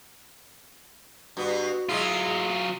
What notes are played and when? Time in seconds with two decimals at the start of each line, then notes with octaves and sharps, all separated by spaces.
1.37 G2 B3 F#4
1.89 F#3 G#3 E4 F4 G#4